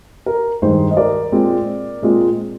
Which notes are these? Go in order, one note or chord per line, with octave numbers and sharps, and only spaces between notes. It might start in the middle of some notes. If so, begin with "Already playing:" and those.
A#4
G2 D#3 G#3 D#4 C5
D#5
A#4 D5
A#2 G#3 C4 F4
A#2 G#3 C4 F4